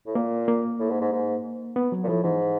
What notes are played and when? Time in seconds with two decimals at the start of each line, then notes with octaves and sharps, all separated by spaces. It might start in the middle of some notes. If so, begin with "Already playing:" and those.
0.07 A2
0.15 A#2 A#3
0.48 A#3
0.80 A2
0.90 G#2
1.01 G#2
1.12 G#2
1.76 B3
1.92 F#3
2.04 A#2
2.08 A2 F3
2.23 G#2 E3